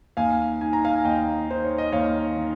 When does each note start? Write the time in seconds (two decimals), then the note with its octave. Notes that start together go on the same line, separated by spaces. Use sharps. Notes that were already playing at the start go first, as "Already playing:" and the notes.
0.17 D#2 F5 G#5
0.61 D#3 G#5
0.73 A#5
0.84 F5 G#5
0.96 G#5
1.05 D#2 D#5 G5
1.48 D#3 C5
1.65 C#5
1.78 D#5
1.92 D#2 C#5 F5
2.36 D#3